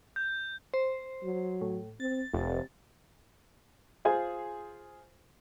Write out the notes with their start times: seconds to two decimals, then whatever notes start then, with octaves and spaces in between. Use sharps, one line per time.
0.16 G6
0.74 C5
1.23 F#3
1.61 A2
2.00 C4 A6
2.33 F1 C3
4.05 F4 G#4 C5 G#5